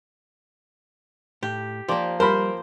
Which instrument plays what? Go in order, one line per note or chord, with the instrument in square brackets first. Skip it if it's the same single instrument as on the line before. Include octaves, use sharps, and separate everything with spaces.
[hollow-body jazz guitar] A2 [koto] G4
[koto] F3 A#3 [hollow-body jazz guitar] G4 D5
[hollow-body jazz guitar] G3 [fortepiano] A#4 B5 [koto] C5